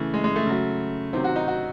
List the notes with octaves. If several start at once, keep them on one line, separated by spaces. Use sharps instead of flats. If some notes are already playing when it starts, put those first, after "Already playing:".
Already playing: C#3 E3 A3
G#3
G#3
A3
C#3 F#3
C3 D#3 F#3 C4
F#4
D#4
F#4